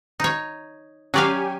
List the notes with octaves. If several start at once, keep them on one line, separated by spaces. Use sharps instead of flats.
D#4 C#5
F#3 C#4 G4 D5 F5 G#5